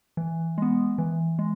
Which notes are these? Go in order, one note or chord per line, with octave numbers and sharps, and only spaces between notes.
E3
G#3 B3
E3
G#3